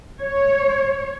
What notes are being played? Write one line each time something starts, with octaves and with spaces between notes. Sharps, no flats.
C#5